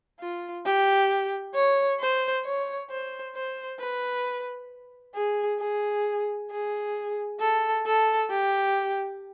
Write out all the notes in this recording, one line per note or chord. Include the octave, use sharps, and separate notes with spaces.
F4
G4
C#5
C5
C#5
C5
C5
B4
G#4
G#4
G#4
A4
A4
G4